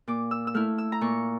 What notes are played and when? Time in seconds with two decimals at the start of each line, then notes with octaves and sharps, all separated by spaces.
0.08 A#2 D6
0.31 E6
0.47 E6
0.54 A3 E4 F6
0.78 E6
0.92 A#5
1.01 A#2 C#6